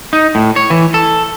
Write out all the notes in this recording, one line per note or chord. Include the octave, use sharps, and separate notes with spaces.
D#4
A2
C#5
E3
A4